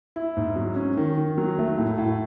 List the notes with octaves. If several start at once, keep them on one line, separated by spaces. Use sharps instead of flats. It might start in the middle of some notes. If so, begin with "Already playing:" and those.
E4
G#2
F#3
C#4
D#3
D#3
F#3
A3
A2
A2